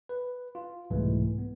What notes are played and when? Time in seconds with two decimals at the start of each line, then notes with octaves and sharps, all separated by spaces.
0.09 B4
0.55 F4
0.90 C2 G#2 B2 E3 G#3 A3
1.38 B3